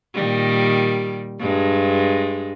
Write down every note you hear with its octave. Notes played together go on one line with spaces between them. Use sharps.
A#2 D#3 G3
G2 G#3